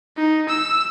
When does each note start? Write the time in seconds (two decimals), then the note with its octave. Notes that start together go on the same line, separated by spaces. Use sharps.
0.17 D#4
0.49 E6